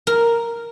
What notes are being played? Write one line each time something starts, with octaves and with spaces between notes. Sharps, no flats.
A#4